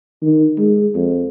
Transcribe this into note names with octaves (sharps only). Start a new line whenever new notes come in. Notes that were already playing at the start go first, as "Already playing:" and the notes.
D#3
G#3
F2